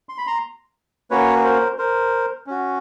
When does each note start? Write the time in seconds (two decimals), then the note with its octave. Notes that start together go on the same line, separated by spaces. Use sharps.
0.09 C6
0.18 B5
0.27 A#5 C6
1.11 A#3 C#4 F#4 B4 C#5
1.44 A#4 C5
1.78 A#4 C5
2.47 C#4 F#4